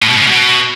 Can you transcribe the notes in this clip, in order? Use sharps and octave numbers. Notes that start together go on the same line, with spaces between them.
A2
B2
G#2
C#3
B2